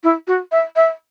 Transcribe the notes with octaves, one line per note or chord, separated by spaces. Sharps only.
E4
F#4
E5
E5